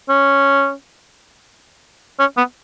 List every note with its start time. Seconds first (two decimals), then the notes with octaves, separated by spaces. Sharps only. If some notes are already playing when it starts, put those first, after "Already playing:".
0.09 C#4
2.20 C#4
2.37 B3